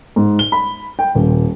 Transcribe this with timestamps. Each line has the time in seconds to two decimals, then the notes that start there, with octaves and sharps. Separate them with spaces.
0.16 G#2
0.39 G7
0.52 B5
0.99 G5
1.15 D#1